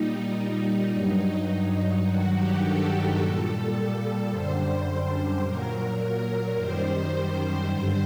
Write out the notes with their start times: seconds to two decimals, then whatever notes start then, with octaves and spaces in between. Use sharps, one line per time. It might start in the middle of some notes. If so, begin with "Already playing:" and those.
Already playing: A#2 G3 D#4
0.92 G2 F#3
2.04 G2 D#3 F#3 F#4
2.33 G4
2.61 A4
3.17 A#2 G3
4.30 F#2 D3 G3 C5
5.43 A#2 F#3 A#4
6.56 F#2 D#3 G3 C5
7.68 G2 D3 G3